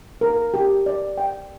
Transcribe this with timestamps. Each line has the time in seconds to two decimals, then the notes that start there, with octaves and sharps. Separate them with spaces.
0.21 A#4
0.54 G4
0.86 D5
1.18 G5